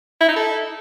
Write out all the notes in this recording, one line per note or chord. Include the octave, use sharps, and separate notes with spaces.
E4
D#4
A4